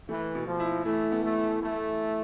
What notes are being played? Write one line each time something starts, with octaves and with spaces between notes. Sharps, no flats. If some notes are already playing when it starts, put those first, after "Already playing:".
E3 A3
B2
F3
E4
E3 A3
B3
A3
E3
A3 E4
E3